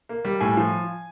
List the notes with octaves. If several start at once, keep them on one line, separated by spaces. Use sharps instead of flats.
A#3
G3
A2 G#5
F3